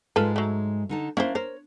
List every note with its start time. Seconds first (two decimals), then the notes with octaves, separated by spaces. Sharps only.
0.16 G#2 G#3 F4 A4 B4
0.36 F#3 A3
0.89 D3 D#4 A5
1.17 A#3 C#4 D4 E4 C5
1.35 A#4 C5 C#5